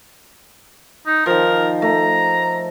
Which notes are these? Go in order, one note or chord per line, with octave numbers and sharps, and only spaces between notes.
D#4
D#3 F3 A#4
A3 A#5